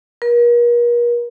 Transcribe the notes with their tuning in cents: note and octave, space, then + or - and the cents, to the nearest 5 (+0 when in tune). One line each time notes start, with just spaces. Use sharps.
A#4 +40